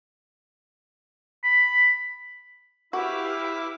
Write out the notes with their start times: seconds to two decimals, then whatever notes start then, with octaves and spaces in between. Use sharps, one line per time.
1.43 B5
2.93 E4 F#4 G4 B4 E5 F5 D6